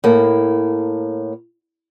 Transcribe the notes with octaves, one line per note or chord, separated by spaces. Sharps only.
A2 A#3